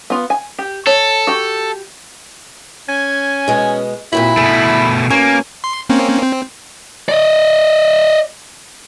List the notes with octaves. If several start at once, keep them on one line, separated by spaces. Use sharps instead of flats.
B3 F4
G#5
G4
A4 C#5
F#4 G4
C#4 G#5
B2 G#3
A#2 C4 E4 F#4 B5
B2 A3 G#4
B2 A#3 C#4 G#5
C6
A#3 C4 C#4
C4
D5 D#5